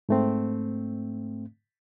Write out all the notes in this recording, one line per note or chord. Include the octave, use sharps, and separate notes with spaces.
G#2 A3 C4